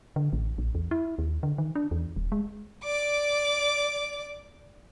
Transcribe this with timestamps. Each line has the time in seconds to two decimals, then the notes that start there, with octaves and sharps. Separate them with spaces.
0.16 D3
0.33 A1
0.58 A#1
0.75 E2
0.91 E4
1.19 D#2
1.43 D3
1.58 D#3
1.75 D4
1.91 E2
2.16 D#1
2.32 G#3
2.84 D5 D6